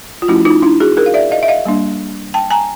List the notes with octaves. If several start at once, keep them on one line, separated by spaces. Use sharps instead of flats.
F4
F3 A3 C#4 E4 F#4
D#4 F4
D4 E4
F#4 G#4
G#4 A#4
F5
D5 E5
D#5 F5
E5
D#5 F5
G3 A#3 D4
G5 A5
G#5 A#5